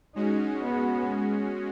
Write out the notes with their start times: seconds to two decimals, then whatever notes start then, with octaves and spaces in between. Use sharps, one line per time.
0.15 G#3 C#4 D#4 F#4
0.62 B3